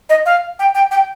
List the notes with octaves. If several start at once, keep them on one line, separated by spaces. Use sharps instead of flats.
D#5
F5
G5
G5
G5